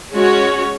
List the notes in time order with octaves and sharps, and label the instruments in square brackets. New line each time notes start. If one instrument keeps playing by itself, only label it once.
[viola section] G#3 C#4 F#4 C#5